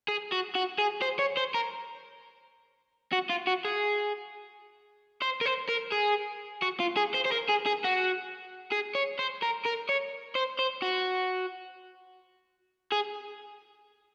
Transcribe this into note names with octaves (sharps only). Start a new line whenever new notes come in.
G#4
F#4
F#4
G#4
C5
C#5
C5
A#4
F#4
F4
F#4
G#4
C5
A#4
C5
A#4
G#4
F#4
F4
G#4
C5
C5
A#4
G#4
G#4
F#4
G#4
C#5
C5
A#4
A#4
C#5
C5
C5
F#4
G#4